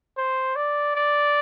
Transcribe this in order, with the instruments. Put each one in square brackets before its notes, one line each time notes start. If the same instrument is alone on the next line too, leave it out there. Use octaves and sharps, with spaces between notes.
[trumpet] C5
D5
D5